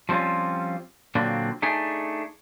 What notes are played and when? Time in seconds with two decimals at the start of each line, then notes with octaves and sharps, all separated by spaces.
0.09 F3 G3 C4 C#4 F4
1.15 A#2 D3 F#3 A#3 C4 D4
1.62 A3 D4 D#4 G#4